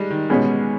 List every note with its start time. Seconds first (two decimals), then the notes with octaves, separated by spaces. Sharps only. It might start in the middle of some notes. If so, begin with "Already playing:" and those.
Already playing: G3 G#3
0.10 D#3
0.30 B2 G#3 C#4